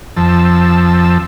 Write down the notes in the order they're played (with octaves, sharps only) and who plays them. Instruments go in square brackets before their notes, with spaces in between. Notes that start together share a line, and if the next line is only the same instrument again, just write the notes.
[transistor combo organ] F2 F3 A5 E6